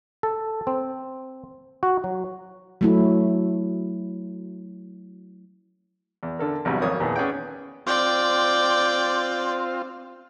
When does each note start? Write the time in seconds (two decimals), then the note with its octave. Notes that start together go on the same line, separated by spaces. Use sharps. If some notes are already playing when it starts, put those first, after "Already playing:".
0.23 A4
0.67 C4
1.83 F#4
2.04 F#3
2.81 F#3 A3 E4
6.23 E2
6.39 D3 A4 A#4
6.65 A1 E2 C3 F#3 G3
6.81 G#1 F2 A#3 C#5 D#6
7.00 D#2 A#2 E3 B3 G#4 A5
7.16 B3 C#4 G#4 D5 F#5 G5
7.87 C4 F4 D5 G5